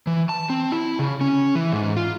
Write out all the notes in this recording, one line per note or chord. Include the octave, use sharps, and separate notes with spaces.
E3
A5
C4
E4
C#3
C#4
E3
G#2
F4